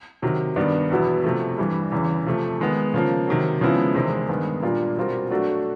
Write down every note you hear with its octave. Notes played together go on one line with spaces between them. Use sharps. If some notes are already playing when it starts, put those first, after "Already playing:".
C3 D#3 F#3
G2 D#3 G3 B3 D4
E2 B2 F#3 B3 E4
C3 F3 A3
G2 E3 G3
E2 C#3 E3
C3 F3 A3
D#3 G#3 B3
C#3 F3 A#3
C3 D#3 F#3
C#3 F3 G#3 B3 E4
E2 C3 D#3 G#3 C4
G2 D#3 G#3 B3
A#2 G3 A#3 D4 F4
B2 G3 C4 F4 A#4
F#3 A3 D4 F#4 A4